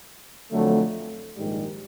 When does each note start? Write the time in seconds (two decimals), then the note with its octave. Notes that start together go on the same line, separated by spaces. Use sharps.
0.52 F2 D3 F#3 A3
1.36 A#1 G#2 D#3 G3